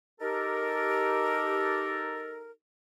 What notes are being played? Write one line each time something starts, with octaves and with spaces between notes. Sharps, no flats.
D#4 G4 A4 A#4